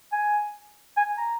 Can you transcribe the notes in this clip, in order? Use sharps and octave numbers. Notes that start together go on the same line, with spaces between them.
G#5
G#5
A#5